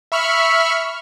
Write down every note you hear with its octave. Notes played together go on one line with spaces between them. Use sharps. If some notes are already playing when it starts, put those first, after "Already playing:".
E5 B5 C#6 F6